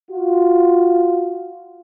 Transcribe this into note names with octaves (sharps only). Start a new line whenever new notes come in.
F4 F#4